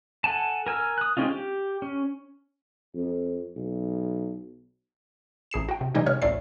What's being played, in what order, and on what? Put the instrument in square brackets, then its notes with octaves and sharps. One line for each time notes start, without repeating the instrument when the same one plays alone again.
[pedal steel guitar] A4 F#5 G#5 A5
A#4 G#5 E6 F6
D#6 F#6
G#3 C4 C#4 D#4 F4
G4
C#4
[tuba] F2
B1
[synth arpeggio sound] A1 G#4 C7 E7
F#4 G5
C3
B2 E3 G3 G#3 D#4 G4
C3 G#3 B3 C#5 F6
A1 D2 A2 D5 E5 C7